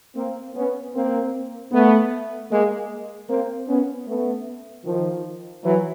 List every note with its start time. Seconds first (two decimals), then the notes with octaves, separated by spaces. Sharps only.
0.16 A#3 C4
0.55 B3 C#4
0.94 A#3 C4
1.72 A3 B3
2.50 G#3 A#3
3.28 A#3 C4
3.68 B3 C#4
4.07 A3 B3
4.85 D#3 F3
5.63 E3 F#3